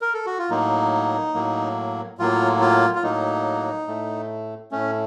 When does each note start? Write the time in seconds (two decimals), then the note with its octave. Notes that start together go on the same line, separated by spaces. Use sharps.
0.01 A#4
0.14 A4
0.26 F#4
0.38 F4
0.50 A2 F#3 A#3 D#4
1.34 A2 F#3 A#3
2.18 A2 F#3 A#3 F4
2.61 F4
2.95 F4
3.03 A2 F#3 A#3 D#4
3.87 A2 A3
4.71 A2 A3 C#4